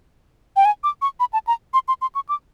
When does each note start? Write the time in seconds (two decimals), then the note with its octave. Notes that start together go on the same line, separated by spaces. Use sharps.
0.56 G5
0.65 G#5
0.84 D6
1.02 C#6
1.20 B5
1.33 A5
1.47 A#5
1.74 C6
1.88 C6
2.02 C6
2.15 C#6
2.29 D6